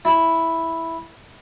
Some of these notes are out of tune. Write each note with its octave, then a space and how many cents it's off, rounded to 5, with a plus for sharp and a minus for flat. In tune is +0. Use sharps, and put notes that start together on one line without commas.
E4 -5